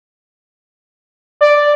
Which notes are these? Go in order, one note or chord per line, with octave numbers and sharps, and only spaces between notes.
D5